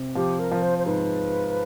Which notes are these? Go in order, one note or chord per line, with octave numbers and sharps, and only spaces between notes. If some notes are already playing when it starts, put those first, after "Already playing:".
Already playing: C3
F3 G4
A#4
F3
C5
C5
G#2 B4